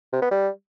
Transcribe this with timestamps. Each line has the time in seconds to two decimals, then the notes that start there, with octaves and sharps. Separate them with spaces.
0.13 C3
0.22 B3
0.31 G3